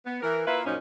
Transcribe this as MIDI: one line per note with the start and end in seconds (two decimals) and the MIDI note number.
0.06 0.22 59
0.23 0.43 52
0.23 0.43 70
0.47 0.63 58
0.47 0.63 64
0.47 0.63 65
0.47 0.63 71
0.47 0.63 76
0.65 0.77 42
0.65 0.77 46
0.65 0.77 53
0.65 0.77 61
0.65 0.77 63